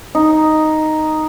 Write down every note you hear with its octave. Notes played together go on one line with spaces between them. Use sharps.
D#4